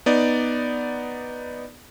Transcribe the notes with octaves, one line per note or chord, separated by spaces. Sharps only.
B3 D#4 D5